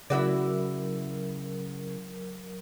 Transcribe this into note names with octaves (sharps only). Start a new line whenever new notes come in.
C#3 F#3 E4 F#4 A#4 D5